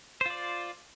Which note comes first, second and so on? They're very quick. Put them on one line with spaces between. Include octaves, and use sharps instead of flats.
C5 F4 D5